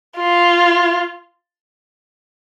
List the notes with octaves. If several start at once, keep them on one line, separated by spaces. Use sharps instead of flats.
F4